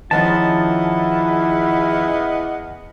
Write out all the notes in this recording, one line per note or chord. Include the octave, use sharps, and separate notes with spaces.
E2 D#3 F3 B3 C#4 E4 D#5 A5